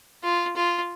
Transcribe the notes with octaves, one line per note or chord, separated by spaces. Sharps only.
F4
F4